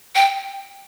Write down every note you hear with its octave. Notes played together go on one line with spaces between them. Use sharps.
G5